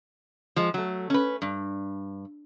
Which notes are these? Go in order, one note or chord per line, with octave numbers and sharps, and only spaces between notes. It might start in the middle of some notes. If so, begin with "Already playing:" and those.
F3 G#3
F#3 A3
C#4 B4
G2